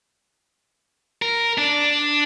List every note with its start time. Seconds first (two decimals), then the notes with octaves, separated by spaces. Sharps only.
1.22 A#4
1.58 D4